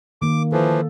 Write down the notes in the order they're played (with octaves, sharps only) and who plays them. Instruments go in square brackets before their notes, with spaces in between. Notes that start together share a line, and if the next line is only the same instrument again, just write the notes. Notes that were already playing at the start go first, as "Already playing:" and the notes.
[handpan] D#3 A#3 [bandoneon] D6
[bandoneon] E3 F3 [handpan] A4